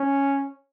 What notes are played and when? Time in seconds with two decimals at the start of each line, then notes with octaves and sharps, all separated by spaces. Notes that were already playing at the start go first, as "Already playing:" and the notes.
Already playing: C#4